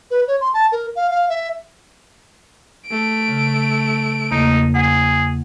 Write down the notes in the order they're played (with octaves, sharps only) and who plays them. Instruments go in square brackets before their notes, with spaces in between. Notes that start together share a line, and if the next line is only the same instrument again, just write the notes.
[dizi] B4
C#5
C6
A5
A#4
F5
F5
E5
[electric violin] A3 D7
[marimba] C#3
[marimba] E2 C#3 A#3 [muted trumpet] D#4
[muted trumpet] G#4 [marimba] F#5